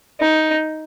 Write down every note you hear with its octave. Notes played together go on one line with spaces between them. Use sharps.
D#4